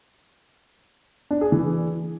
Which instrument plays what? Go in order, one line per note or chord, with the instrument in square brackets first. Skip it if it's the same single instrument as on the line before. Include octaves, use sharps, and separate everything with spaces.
[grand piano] D4
G#4
E3